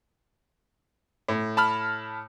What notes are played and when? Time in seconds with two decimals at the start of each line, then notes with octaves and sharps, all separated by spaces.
1.28 A2
1.57 A5 B5 F6